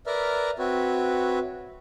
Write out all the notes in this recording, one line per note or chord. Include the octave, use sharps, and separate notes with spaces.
A#4 B4 D5 E5 A#5 F6
C4 F#4 B4 C#5 E5